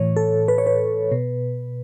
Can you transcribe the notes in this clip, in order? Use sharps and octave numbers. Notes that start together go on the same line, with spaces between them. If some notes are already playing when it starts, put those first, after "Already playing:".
Already playing: A2 E3 C#5
A4
B4
C#5
B4
B2